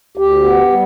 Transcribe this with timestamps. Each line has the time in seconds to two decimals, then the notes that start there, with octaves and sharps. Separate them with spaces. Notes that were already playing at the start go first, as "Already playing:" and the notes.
0.18 D2 G4
0.44 B3
0.71 G3